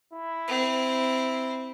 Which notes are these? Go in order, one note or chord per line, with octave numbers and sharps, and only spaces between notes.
E4
C4